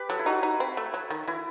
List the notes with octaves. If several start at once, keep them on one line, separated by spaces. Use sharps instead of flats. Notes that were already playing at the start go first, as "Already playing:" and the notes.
Already playing: G4 B4
F#3 A4
E4
D#4 F#4
D#4
C4
A3
F#3
D#3
E3 E4